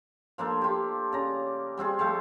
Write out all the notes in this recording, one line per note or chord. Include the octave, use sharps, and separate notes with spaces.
F3 A#3 D4 A4
F4 G4
C#3 A#5
G3 C4 F4 G#4
F3 A3 G#4 F5